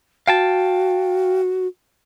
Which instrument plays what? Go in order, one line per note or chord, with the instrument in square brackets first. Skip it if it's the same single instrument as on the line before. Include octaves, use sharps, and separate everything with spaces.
[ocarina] F#4 [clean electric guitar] F5 G5 A5